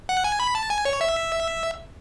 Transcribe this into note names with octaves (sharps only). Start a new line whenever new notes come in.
F#5
G#5
B5
A5
G#5
C#5
E5